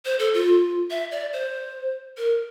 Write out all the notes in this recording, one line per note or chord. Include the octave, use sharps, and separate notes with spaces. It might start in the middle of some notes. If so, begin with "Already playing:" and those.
C5
A4
F4
E5
D5
C5
A#4